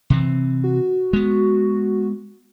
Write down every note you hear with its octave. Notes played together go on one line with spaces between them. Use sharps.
C3 E3 C4
F#4
G#3 B3